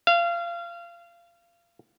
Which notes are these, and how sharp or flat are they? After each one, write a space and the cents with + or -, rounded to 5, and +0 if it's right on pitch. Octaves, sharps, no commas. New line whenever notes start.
F5 -25